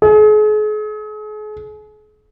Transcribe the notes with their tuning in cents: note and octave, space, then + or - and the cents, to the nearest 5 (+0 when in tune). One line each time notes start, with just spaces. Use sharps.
G#4 +40